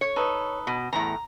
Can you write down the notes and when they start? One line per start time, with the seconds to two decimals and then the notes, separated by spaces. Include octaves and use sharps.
0.01 C#5
0.16 D#4 A4 B4
0.67 B2
0.93 E2 A2 A#5